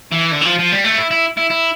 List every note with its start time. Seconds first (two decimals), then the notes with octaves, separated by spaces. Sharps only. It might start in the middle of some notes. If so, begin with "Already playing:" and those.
0.12 E3
0.31 D3
0.41 E3
0.45 F3
0.59 F3
0.72 G3
0.84 A3
0.98 E4
1.11 E4
1.37 E4
1.50 E4